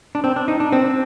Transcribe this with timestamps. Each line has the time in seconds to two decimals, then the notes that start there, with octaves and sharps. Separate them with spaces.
0.15 D4
0.24 C4
0.36 D4
0.48 D#4
0.60 D4
0.72 C4